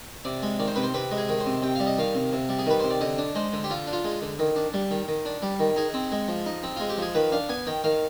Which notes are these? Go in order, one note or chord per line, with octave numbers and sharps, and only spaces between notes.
C3 D5
G#3
D#3 D5
C5
C3 B4
C5
C3 B4
G#3
G#4
D#3
C5
C3
C3 G5
G3 F5
D#5
D#3 F5
C3
C3
G3
G#4
D#3 B4
C3 C5
D5
D3 D#5
D4
G#3 C5
D3
G4
D3 F4
D4
F4
G#3
D3
D#3
D4
G3
D#3
D#3
D4
G3
D#3
D#4 G#4
C4
G#3
F3
D#4
C4
G#3 F4
G4
F3 G#4
D#3 B4
D4 F5
B3 G#5
D#3 G5
D#3 F5